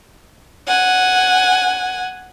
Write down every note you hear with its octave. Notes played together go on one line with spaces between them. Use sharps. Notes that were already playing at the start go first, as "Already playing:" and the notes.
F#5 G#5